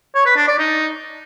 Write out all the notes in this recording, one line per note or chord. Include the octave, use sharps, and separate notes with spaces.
C#5
B4
D4
D5
D#4